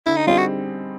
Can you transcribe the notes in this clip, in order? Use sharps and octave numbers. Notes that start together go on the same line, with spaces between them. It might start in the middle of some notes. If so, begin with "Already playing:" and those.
D3 E4
D#4
G3 C4 D#4 F4 G#4
F#4